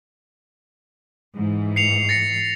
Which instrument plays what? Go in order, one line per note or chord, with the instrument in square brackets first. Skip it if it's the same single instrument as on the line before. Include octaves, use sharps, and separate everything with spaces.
[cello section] G#2 E3
[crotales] C7 C#7 F7
A6 A#6 C#7